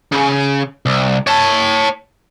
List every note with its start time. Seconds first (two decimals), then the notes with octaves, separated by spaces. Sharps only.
0.12 C#3
0.86 C2
1.27 C#5 A5